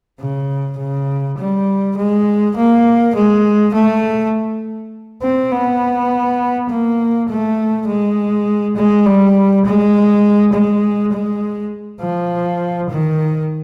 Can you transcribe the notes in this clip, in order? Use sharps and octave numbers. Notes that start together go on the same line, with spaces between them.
C#3
C#3
G3
G#3
A#3
G#3
A3
C4
B3
A#3
A3
G#3
G#3
G3
G#3
G#3
G#3
F3
D#3